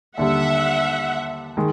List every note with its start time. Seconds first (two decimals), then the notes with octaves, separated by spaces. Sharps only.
0.17 D#2 D3 G3 E5 F#5
1.57 D#3 G#3